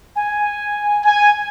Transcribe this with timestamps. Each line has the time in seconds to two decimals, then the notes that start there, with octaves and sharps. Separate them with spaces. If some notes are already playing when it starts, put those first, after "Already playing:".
0.16 G#5
1.04 G#5